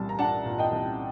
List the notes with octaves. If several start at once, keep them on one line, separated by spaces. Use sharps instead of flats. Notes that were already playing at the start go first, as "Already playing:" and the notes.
Already playing: C2 A#2 G3 A5
A#5
D4 F#5 A5
A#2
D#5 G5
C2